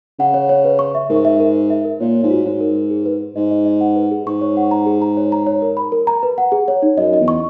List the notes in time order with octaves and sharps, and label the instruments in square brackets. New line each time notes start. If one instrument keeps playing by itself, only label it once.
[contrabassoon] C#3 [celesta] F#5
[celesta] C#5
C#5
B4
C#6
E5
[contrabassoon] G#2 [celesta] A#4
[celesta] E5
A#4
A#4
E5
A#4
[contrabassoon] A#2 [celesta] C#5
[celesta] C#5
[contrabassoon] G#2
[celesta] F#4
[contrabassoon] G#2 [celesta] C#5
[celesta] A#4
A#4
G#4
B4
B4
[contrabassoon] G#2 [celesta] D#5
[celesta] D#5
D#5
F#5
B4
G#4
[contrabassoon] G#2 [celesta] C#6
[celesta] C#5
F#5
A#5
G#4
A#5
C#5
A#5
C#5
A#4
B5
A#4
A#5
B4
F#5
G#4
C#5
D#4
[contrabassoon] F#2 [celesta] D#5
[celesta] D#5
[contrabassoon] E2
[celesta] C#6